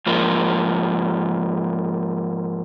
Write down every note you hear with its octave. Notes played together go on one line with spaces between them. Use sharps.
G#2 F3 A#3